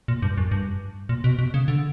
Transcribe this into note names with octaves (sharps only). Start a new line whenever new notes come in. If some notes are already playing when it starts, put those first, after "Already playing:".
A#2
G2
F#2
G2
A#2
B2
B2
C#3
D3